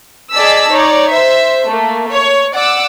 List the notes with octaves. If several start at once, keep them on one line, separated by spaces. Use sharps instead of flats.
G#4 D5 D#5 A5 E6 B6
D#4 C#5 D5
C5 E5
A3 A#3
C#5 C#6
D5 F#5 D6 E6